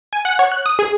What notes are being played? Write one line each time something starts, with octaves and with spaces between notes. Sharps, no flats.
G#5
F#5
C#5
F#6
D#6
G#4